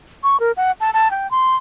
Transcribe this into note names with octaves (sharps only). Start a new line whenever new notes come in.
C#6
A#4
F#5
A5
A5
G5
C6